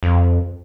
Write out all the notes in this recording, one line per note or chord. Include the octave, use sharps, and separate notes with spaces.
F2